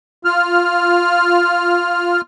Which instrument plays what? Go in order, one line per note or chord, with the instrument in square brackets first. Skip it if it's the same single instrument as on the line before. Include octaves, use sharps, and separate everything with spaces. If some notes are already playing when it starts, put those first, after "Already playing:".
[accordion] F4 F6